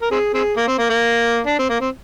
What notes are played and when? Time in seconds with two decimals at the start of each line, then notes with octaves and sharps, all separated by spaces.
0.02 A#4
0.11 C4 G#4
0.34 C4 G#4
0.57 A#3
0.67 C4
0.78 A#3
0.90 A#3
1.47 D4
1.59 C4
1.70 A#3
1.81 C4